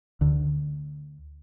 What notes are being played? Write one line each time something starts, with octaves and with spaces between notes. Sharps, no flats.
D2 D3